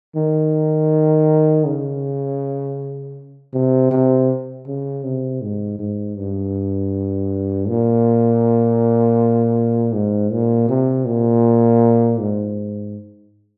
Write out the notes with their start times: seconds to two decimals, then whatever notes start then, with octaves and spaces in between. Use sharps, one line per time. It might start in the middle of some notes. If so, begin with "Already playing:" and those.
0.16 D#3
1.66 C#3
3.54 C3
3.91 C3
4.67 C#3
5.04 C3
5.43 G#2
5.79 G#2
6.18 G2
7.68 A#2
9.93 G#2
10.32 A#2
10.69 C3
11.06 A#2
12.19 G#2